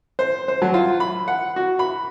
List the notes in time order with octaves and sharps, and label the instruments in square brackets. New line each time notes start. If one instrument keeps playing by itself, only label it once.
[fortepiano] C5
C5
F#3
F4
B5
F#5
F#4
B5